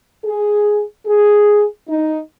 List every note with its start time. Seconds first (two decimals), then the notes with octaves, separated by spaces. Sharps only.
0.25 G#4
1.07 G#4
1.89 D#4